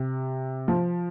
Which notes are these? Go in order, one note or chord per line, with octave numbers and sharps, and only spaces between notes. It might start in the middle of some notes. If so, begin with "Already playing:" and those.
Already playing: C3
F3